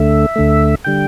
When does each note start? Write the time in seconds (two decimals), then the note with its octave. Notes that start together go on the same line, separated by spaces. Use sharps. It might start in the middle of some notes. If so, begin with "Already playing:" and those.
Already playing: D2 D3 A3 E5
0.36 D2 D3 A3
0.85 D3 G3 G5